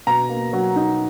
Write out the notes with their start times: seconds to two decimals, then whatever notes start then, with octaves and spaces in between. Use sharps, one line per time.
0.07 B2 A#5
0.29 A#3
0.53 F#3
0.76 D#4